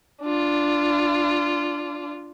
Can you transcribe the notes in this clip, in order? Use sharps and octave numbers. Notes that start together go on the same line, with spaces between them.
D4 F4